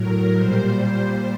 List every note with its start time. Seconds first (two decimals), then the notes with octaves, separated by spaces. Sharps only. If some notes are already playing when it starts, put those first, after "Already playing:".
Already playing: A2 F#3 A#4
0.35 A#2 G3 C5
0.80 C5